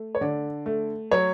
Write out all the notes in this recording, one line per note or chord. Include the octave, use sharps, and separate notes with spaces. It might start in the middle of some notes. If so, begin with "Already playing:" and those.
Already playing: A3
C#5
D3 D5
A3
F#3 C#5